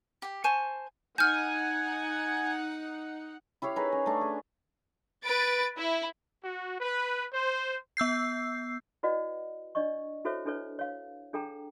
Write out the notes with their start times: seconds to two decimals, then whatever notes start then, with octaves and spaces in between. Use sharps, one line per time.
0.22 G4 G5
0.44 C5 G#5 A5 C#6
1.18 D#4 F#5 G#5 F6 G6
3.62 E4 G4 C#5 F5
3.76 D#4 G#4 A#4 B4
3.92 C#4
4.06 A3 D4
4.21 G#4
5.24 B4 A6 D7
5.78 E4
6.43 F#4
6.81 B4
7.32 C5
7.97 B3 E6 G6 C7
9.03 E4 F#4 B4 D5 D#5 F#5
9.75 D4 D5 D#5 C#6
10.25 E4 F#4 A4 C5 C#5 E5
10.45 D4 E4 A4 B4 C#5
10.79 C#5 F5
11.33 D4 G#4 A4 G5 A#5